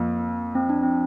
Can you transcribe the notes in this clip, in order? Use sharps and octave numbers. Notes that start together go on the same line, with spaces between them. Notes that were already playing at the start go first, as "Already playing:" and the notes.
Already playing: F2 A#3
C4
D4
C4